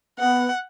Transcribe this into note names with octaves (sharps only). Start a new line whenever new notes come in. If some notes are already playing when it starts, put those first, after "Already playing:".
B3 F#5